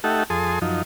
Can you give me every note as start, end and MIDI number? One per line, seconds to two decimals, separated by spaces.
0.04 0.23 57
0.04 0.23 63
0.04 0.23 67
0.04 0.23 69
0.04 0.23 76
0.04 0.23 78
0.30 0.59 41
0.30 0.59 68
0.30 0.59 69
0.30 0.59 84
0.30 0.59 87
0.62 0.82 42
0.62 0.82 53
0.62 0.82 63